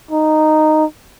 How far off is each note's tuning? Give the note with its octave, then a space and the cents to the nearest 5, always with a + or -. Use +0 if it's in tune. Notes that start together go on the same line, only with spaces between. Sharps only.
D#4 -10